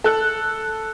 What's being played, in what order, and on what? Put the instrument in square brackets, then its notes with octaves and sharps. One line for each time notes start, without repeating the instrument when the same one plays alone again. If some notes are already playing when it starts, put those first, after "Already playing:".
[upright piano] A4 F#6